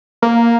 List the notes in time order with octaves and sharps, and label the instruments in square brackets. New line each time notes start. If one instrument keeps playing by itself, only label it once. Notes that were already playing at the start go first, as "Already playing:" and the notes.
[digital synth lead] A#3